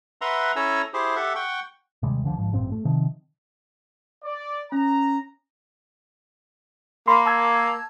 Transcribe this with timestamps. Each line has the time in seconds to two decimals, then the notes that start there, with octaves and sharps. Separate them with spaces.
0.21 B4 E5 F#5 A#5 C6
0.56 C#4 E4 A4 G#5 A#5 E6
0.94 E4 G4 G#4 C5
1.16 G4 A4 E5 F#5
1.35 F#5 G5 C#6
2.02 D#2 C3 G3 G#3
2.24 C#2 D3 F3
2.36 G#1 G#2 F3
2.52 A1 G2 A#2 C4
2.72 A3
2.85 C3 D#3 F3
4.23 D5
4.72 C#4 A#5
7.08 A#3 B5 C6
7.26 A5 E6 G#6